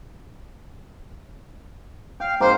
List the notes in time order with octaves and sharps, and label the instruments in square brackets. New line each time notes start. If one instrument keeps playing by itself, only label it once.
[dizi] F5 [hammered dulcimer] G5
[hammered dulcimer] G#2 A#3 C4 [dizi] C5